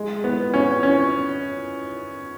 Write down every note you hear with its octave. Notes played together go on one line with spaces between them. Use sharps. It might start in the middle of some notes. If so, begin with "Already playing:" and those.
Already playing: G#3
B3
C#4
C#4